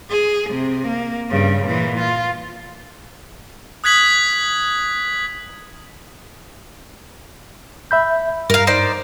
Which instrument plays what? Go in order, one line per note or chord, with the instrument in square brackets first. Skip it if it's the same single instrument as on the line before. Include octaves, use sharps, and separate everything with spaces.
[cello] G#4
C3
A#3
G2 C#3
A#2 E3
F4
[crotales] D#6 F#6 G#6 B6 F#7
[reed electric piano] E5 B5 G6
[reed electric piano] G2 [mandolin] A#4 F5
[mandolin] D#4 C5 D5